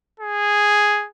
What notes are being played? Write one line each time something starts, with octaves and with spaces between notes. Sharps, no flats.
G#4